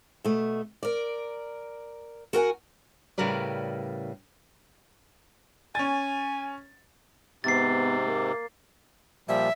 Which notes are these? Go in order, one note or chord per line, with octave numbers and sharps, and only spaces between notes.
B2 A3
A#4 D5
F#4 A#4 F#5 G#5
A2 C#3 G3 A#4 B4 D5
C#4 G#5 A6
G#2 C3 B3 A6 C7
A#3
A#2 F3 G3 E5